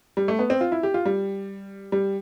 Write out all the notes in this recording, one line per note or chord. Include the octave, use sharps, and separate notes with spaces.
G3
A3
B3
C4
F4
E4
G4
F4
G3
G3